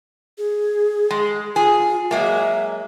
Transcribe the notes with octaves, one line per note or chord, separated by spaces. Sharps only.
G#4
G#3
F4 G#4
F#3 G#3 A#3 E5